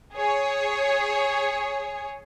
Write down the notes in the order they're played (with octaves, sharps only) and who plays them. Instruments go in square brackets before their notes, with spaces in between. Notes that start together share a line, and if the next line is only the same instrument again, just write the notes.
[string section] G#4 C#5